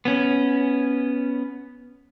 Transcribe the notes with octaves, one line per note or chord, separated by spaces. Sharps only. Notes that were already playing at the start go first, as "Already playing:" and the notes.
B3 C#4